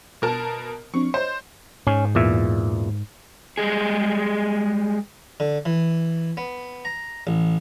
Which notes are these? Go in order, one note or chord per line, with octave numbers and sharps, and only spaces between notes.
B2 A#4 A5
F3 C4 D4 C#6
C5 C#5 D#5
G#2 C#4
E2 A#2 E5
G3 G#3 G#4
D3
E3
B3
A#5
A1